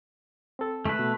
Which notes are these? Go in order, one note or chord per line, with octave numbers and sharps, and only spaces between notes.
C4 A4
A3 B4
B2